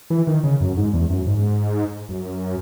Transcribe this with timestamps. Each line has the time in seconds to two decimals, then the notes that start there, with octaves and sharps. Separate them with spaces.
0.10 E3
0.27 D#3
0.44 C#3
0.61 F#2
0.77 G#2
0.93 E2
1.10 F#2
1.26 G#2
2.09 F#2